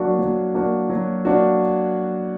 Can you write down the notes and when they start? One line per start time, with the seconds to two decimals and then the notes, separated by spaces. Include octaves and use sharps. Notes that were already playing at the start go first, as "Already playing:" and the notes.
Already playing: F#3 A#3 D4 F#4
0.19 F#3
0.54 A#3 D4 F#4
0.90 F#3
1.25 A#3 D4 F#4